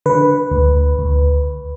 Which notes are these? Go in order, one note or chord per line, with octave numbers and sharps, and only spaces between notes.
D3 B4
D2
D2